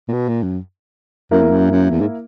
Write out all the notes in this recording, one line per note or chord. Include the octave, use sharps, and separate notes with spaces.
A#2
B2
A#2
F#2
F#2 A#3 E4 A#4
E2
F#2
F#2
E2
G#2